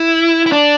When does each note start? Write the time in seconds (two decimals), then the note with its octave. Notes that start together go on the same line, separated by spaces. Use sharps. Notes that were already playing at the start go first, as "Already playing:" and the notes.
Already playing: E4
0.46 E4
0.52 D4